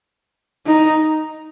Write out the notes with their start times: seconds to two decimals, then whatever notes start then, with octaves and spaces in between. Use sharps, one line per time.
0.67 D#4